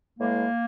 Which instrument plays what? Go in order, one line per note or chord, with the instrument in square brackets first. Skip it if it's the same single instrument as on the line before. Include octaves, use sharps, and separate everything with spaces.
[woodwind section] A2 E3 G#3 A#3